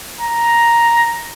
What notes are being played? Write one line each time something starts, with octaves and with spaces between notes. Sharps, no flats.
A#5